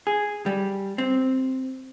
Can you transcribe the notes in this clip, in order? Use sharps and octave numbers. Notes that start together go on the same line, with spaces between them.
G#4
G3
C4